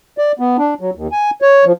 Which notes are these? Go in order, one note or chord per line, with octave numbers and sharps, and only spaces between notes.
D5
B3
D4
F#3
D#2
G#5
C#5
F3